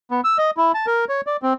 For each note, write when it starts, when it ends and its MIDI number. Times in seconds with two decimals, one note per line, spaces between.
0.11 0.21 59
0.24 0.37 88
0.38 0.51 75
0.57 0.72 64
0.74 0.86 81
0.87 1.05 70
1.09 1.21 73
1.27 1.37 74
1.42 1.53 60